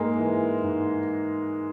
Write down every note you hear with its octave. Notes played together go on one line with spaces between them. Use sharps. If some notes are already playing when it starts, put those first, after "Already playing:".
Already playing: G#2 G#3 A#3
E3
G#2